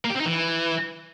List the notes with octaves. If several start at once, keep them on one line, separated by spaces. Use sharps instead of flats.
A#3
G4
C4
D#4
E3